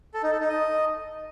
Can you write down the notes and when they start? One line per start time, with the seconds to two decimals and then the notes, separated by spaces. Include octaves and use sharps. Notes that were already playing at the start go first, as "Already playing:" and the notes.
0.14 A4
0.23 D#4
0.32 A4
0.40 D#4
0.49 D#5